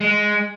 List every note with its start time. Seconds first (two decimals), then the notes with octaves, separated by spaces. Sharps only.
0.01 G#3